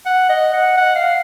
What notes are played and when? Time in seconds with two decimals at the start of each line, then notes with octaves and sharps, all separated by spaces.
0.06 F#5
0.29 D#5
0.54 F#5
0.77 F#5
0.95 F5